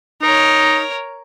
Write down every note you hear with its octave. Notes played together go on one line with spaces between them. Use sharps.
D#4 A#4 C#5